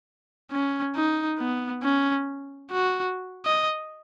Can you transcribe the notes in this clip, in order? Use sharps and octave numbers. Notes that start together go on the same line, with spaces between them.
C#4
D#4
B3
C#4
F#4
D#5